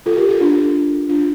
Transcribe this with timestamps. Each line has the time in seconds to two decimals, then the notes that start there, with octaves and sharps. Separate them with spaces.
0.06 F4 A4
0.17 G4 A#4
0.29 F4 A4
0.40 D4 F4
1.09 D4 F4